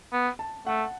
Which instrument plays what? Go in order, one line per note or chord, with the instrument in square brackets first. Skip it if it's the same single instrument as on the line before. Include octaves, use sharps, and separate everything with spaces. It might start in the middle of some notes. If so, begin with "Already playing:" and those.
[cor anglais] B3
[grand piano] A5
[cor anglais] A3 [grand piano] F#5